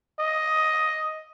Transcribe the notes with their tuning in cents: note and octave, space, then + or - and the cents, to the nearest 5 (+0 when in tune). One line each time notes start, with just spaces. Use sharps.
D#5 +10